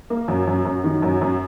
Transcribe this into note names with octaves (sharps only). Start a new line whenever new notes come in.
A#3
F#2
F#2
F#2
D#3
F#2
F#2